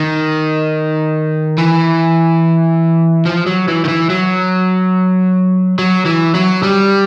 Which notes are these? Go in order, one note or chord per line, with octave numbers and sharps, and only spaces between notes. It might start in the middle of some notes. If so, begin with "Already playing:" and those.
Already playing: D#3
E3
F3
F#3
E3
D#3
E3
F#3
F#3
E3
F#3
G3